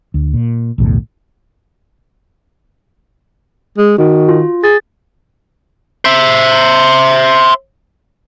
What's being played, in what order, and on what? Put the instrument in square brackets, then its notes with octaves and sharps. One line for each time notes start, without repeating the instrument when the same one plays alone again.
[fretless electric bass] D2
A#2
B1 E2 A2 D3
[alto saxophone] G#3
[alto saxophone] D#3 [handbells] F#4
[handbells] F4
[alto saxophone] G#4 [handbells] A6
[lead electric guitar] C5 E5